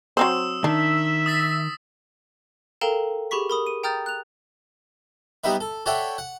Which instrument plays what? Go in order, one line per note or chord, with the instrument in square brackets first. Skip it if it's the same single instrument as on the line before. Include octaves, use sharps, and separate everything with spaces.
[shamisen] F#3 C4 C5 [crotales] D#6 E6 E7
[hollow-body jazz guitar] D#3 [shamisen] D4 [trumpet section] E5
[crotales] D#6 A6 B6
[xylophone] A4 A#4 F5 G5 A#5 E7
G4 G#4 B5 C#6 B6
A#4 B5 D#6
D#7
G5 A#5 D#6 F6 G6 A6
F#6 F7
[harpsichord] G3 B3 D#4 B4 E5
A4
A4 C#5 D5 E5 F#5 G5
F#5